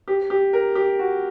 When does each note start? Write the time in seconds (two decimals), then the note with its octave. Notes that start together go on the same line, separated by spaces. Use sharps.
0.08 G4
0.30 G4
0.53 A#4
0.75 G4
0.99 F#4